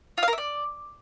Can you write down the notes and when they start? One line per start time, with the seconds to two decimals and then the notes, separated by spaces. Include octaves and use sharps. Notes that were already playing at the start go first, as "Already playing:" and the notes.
0.18 F4
0.23 F5
0.28 A#4
0.33 E5
0.38 D5